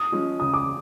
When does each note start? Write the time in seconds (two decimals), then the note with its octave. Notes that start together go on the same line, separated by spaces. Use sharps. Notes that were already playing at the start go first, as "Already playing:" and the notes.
Already playing: D#6
0.12 F3 G#3 C#4
0.40 C#3 D#6
0.54 D6